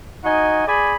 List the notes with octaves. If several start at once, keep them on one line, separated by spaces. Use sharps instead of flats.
D#4 F#4 D#5 G#5
G#4 D5 G#5 B5